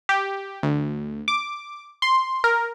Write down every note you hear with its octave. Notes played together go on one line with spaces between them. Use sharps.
G4
D2
D6
C6
A#4